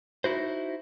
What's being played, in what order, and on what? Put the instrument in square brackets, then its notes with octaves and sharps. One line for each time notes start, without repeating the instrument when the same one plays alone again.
[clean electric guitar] D#4 E4 F#4 C5